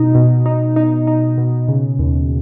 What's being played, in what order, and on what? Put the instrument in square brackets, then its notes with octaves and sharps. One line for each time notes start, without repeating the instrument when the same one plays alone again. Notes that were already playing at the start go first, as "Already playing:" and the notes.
Already playing: [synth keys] B2 D#4
B2
D#4
D#4
D#4
B2
C#3
D#2